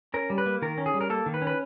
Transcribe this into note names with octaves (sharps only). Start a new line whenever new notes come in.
C#4 A#4
G3
B4
A#3
D#3 A#4
C#4
G#4
G3
A#4
A#3 A4
D#3
B4
C#4
B4